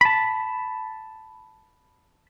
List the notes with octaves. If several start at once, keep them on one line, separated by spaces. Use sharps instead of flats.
A5 B5